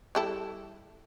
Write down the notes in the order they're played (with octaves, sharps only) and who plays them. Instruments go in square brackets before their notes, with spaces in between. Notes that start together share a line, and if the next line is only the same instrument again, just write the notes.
[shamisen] G3 E4 A4